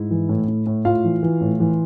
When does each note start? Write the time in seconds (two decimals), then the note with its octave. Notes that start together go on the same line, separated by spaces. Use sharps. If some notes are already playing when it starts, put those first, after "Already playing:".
Already playing: G#2 E4
0.11 E3
0.29 A2
0.48 A2
0.66 A2
0.85 A2 F4 F5
1.04 E3
1.23 E3
1.41 A2
1.60 E3